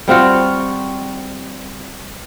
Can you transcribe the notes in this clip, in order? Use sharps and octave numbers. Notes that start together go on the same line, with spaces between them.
G3 C4 F4 F#4